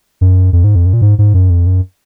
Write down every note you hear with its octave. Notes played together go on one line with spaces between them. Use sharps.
F#2
F2
G#2
F2
F#2
A#2
G#2
G#2
F#2
F2
F#2